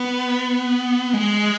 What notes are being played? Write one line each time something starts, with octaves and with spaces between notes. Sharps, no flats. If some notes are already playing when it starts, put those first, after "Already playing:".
Already playing: B3
G#3